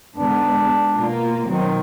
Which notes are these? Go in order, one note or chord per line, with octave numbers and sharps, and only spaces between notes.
G#2 D3 B3 D4
B2 A#3 F4
B2 D#3 F#3 C4